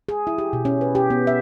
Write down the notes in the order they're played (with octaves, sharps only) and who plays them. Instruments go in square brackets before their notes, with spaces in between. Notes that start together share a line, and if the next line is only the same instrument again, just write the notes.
[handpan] G#4
E4
G4
B2
C#4
B4
G4
B3
E5